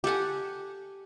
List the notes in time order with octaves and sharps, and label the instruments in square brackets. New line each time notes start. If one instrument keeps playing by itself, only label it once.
[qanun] G4 A4 F#5 G#5